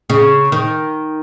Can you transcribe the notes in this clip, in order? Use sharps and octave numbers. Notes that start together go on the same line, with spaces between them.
C#3
D#3